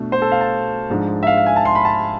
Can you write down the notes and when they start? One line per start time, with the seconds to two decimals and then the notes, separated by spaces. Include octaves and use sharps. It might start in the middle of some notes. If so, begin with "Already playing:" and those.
Already playing: B2 A3 D4
0.12 C5
0.22 A4
0.32 F5
0.41 A5
0.90 G#2 F3 G#3 D4
1.23 E5
1.27 F5
1.38 F5
1.46 G#5
1.56 A5
1.65 C6
1.75 B5
1.85 A5